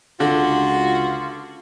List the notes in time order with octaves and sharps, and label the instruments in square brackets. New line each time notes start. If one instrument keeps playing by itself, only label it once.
[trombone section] C#2 [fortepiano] D3 [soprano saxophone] F4 [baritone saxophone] F#4